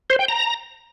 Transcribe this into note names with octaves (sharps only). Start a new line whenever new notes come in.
C5
G5
A#5